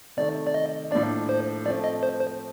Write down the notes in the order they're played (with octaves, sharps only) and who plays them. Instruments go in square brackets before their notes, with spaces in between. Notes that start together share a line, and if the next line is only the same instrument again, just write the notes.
[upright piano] C3 D#3 A3 [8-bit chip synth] D5
[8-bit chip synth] D5
D#5
[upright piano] A2 F3 A#3 D4 [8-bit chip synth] D5
[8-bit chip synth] C5
[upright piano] F3 A3 C4 [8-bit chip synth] D5
[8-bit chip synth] D#5
C5
C5